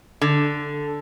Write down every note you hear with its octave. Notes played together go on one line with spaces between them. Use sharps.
D3